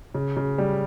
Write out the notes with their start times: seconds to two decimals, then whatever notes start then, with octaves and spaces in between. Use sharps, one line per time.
0.14 C#3
0.37 C#3
0.58 G3